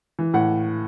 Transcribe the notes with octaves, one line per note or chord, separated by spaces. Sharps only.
E3
A2 F#5